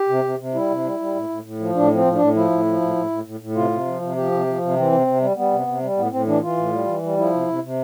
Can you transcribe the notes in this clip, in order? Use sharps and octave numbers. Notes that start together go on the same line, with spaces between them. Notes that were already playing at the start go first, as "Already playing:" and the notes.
Already playing: G4
C3
C3
C3
G3 E4
C3
G3
G3
A2
A2
A2
F3
A2 D4
F3 C4
A2
D4
A2
F3 E4
A2
F3
A2
A2
A2
A2
A2
C3 F4
C3
F3
C3
F3 G4
C3
F3
C3
E3 C4
C3
C3
G3
G3 B3
C3
C3
G3
A2 B3
A2 C4
E3 D4
E3 F4
A2
G3
E3
G3
F3 E4
C3
C3
C3